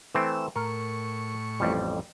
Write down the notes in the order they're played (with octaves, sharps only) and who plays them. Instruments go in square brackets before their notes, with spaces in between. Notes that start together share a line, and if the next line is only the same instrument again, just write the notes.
[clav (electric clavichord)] E3 A3 C4 [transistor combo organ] E6
[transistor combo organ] A2 C#6 [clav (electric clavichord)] A#4
[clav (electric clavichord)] A1 F2 G3